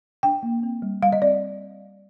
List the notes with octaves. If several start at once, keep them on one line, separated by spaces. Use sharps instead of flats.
D4 G5
A#3
C4
G3
G3 F5
D#5
C4 D5